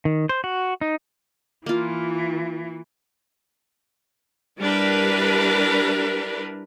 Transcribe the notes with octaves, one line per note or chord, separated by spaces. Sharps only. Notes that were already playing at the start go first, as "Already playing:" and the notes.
D#3
C5
F#4
D#4
E3 A#3 F4
G3 D4 E4 A#4 B4